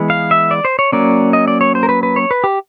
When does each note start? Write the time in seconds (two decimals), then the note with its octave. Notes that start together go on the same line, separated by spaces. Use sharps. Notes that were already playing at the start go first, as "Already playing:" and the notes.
Already playing: E3 G#3 B3
0.10 F5
0.31 E5
0.51 D5
0.65 C5
0.79 C#5
0.92 F#3 A#3 C#4 D5
1.33 D#5
1.48 D5
1.61 C#5
1.75 C5
1.83 A#4
1.89 B4
2.03 B4
2.16 C#5
2.31 B4
2.44 G4